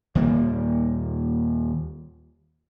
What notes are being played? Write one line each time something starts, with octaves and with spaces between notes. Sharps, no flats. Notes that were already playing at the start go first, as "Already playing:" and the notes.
D#2 A#2 G3 A#3